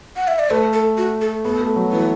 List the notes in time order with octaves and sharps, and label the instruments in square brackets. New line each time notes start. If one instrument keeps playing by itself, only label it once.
[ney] F#5
E5
D5
[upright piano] A3 [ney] B4
[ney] A4
F#4
A4
[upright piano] B3 [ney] A4
[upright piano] A3
F#3
[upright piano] E3 [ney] B4